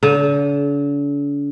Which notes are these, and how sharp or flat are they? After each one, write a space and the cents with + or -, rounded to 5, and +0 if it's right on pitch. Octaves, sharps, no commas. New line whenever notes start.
D3 -45